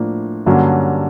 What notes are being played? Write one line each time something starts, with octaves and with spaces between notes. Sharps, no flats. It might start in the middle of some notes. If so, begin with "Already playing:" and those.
Already playing: A2 F3 A#3 D4
G2 D3 F#3 A#3 C#4